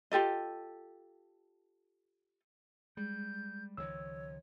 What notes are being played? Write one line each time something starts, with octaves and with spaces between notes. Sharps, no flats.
F4 G4 A4 D#5
G3 G#3 G6
C#2 D#3 F3 C#5 E6